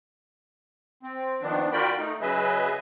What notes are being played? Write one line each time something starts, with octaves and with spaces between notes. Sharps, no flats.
C4
D#3 F3 B3 D4
F4 F#4 A#4 D5 G5 B5
A3 D#4
C#3 F#3 G#4 B4 D#5 E5